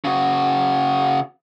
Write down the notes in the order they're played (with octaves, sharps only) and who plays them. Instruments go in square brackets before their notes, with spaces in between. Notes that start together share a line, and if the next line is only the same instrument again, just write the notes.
[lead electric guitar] C#3 F#4